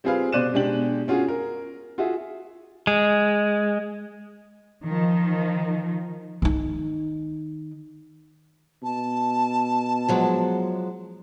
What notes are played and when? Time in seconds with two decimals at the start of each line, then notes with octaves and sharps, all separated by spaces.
0.04 G3 C4 F4 G#4 B4 F5
0.32 B2 C5 D5 F#6 D#7 E7
0.54 B2 G#3 D4 G4 F#7
1.08 C#4 F4 F#4 G#4
1.28 A#4
1.98 F4 F#4 G#4 E5
2.87 G#3
4.86 D#3 F3
6.42 D#3 D#4
8.83 B2 A5
10.09 F3 F#3 G#3